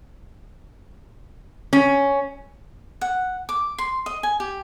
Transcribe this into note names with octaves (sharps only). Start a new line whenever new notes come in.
C#4
F#5
D6
C6
D#5
G#5
G4